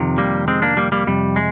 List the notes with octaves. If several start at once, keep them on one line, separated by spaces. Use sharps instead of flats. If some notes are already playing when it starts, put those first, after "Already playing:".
Already playing: F2 C3 D#3
G3 A#3
G#3 C4
A#3 D4
G3 A#3
G3 A#3
F2 C3 G3
G#3